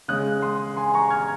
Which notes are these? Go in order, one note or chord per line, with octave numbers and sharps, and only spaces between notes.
C#3 G#3 C#4 D#6 F#6
C6 D#6
G#5 C6
A#5 C#6
F6 G#6